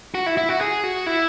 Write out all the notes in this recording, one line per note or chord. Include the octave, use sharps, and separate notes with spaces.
F#4
E4
E4
F#4
G#4
F#4
E4